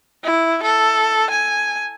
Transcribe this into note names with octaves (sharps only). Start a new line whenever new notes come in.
E4
A4
G#5